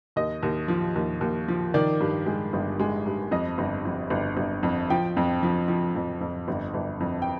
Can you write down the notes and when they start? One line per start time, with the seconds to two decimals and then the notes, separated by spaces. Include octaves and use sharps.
0.16 D#2 D#5
0.43 D#2
0.68 F3
0.96 D#2
1.21 D#2
1.48 F3
1.74 D#3 D5
2.01 G2
2.26 G#3
2.53 G1
2.80 G#3
3.06 G2
3.31 F2 D#5
3.58 G1
3.85 F2
4.10 G1
4.37 G1
4.63 F2
4.90 F3 G5
5.17 F2
5.43 F3
5.68 F3
5.96 F2
6.21 F2
6.48 G1
6.74 G1
7.00 F2
7.22 G5